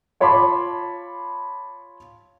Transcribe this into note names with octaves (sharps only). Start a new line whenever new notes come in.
F4 C#5 A5 B5 C6 D6